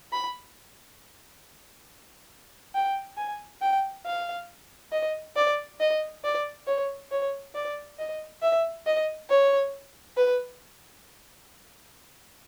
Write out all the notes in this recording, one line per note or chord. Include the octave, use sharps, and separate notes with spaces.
B5
G5
G#5
G5
F5
D#5
D5
D#5
D5
C#5
C#5
D5
D#5
E5
D#5
C#5
B4